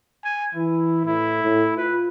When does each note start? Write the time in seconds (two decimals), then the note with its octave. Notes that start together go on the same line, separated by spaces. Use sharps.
0.25 G#5
0.55 E3 E4
1.05 A2 E4
1.43 A2
1.77 F4 B4